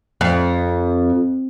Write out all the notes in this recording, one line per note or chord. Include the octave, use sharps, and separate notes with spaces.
F2